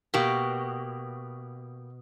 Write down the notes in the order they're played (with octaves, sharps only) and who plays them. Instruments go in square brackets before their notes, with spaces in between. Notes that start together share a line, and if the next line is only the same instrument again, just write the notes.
[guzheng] B2 [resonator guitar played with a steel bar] A#3 G4